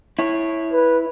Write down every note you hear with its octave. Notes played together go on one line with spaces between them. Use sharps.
E4 C#5
B4